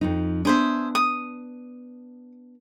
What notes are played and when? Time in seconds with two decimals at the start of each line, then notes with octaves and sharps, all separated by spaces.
0.01 F2 F3 D#4
0.45 B3 D4 G#4 C5 E5
0.95 D#6